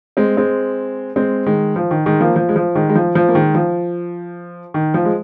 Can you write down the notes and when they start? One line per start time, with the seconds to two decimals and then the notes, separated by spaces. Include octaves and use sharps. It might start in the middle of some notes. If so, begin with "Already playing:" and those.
0.17 G#3 C4
0.37 G#3 C4
1.16 G#3 C4
1.46 D#3 G#3
1.76 F3
1.91 D#3
2.06 D#3 G#3
2.21 F3 A#3
2.36 F3
2.49 G#3
2.56 F3
2.75 D#3 G#3
2.89 G#3
2.95 F3
3.15 F3
3.28 A#3
3.35 D#3 G#3
3.55 F3
4.74 D#3
4.94 F3
5.05 G#3